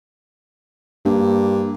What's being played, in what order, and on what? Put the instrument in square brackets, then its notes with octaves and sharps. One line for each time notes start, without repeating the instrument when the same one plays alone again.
[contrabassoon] G2 [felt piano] A#3